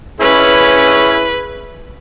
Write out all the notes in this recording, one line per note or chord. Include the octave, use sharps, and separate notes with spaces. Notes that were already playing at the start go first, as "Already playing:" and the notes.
C#4 E4 G#4 B4